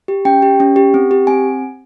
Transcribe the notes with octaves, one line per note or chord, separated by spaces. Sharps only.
G4
C#4 G5
G4
C#4
G4
C4
G4
C4 G#5